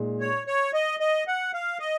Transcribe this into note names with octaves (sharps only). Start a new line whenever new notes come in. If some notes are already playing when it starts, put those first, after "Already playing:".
Already playing: A#2 G#3 D#4
C#5
C#5
D#5
D#5
F#5
F5
D#5